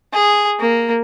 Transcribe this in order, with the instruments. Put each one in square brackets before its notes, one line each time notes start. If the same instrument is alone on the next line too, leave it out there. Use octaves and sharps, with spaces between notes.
[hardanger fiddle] G#4
A#3